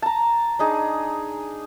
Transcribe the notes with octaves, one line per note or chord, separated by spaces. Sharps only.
A5 A#5
D4 D#4 G#4